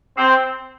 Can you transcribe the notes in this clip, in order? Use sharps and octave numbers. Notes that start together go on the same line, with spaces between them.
C4